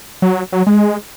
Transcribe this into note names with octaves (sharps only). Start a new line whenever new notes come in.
F#3
F#3
G#3